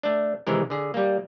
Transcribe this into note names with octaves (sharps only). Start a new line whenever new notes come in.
A3 D4
C3 D#3 E3 G#3 A#4
D3 G#4
G3 A#3